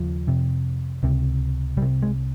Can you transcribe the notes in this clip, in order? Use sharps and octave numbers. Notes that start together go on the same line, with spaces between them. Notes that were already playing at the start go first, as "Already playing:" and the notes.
Already playing: D#2 C#3 F3
F2 C3
C#2 C3
C2 G3
C3
G#3